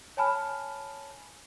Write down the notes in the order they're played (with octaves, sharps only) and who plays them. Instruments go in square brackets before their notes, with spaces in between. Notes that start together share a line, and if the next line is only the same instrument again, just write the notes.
[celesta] C#5 G#5 A5 B5 F6